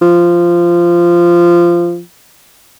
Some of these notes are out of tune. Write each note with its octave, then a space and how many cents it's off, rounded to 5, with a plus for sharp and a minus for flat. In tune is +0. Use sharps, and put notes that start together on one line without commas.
F3 -15